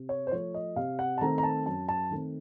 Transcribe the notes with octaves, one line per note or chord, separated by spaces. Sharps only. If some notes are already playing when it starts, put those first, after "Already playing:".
Already playing: C3
C#5
C5
F3 A3 C#5
D#5
C3 F5
F#5
A5
D#3 A3 C4 A#5
A#5
A5
F#2 A5
A5
D#3 A3 C4